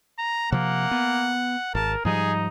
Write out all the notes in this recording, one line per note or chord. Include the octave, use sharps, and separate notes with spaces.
A#5
C3 F3 A#3 F#5
B3
G#1 A#4 A5
G#2 F3 G3 D#4 G#4